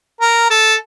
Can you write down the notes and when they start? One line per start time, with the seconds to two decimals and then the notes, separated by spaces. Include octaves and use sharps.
0.21 A#4
0.50 A4